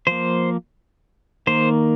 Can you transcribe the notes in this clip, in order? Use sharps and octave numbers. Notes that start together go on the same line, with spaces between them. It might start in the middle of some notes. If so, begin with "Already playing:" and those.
F3 A#3 C5
D#3 A#3 C5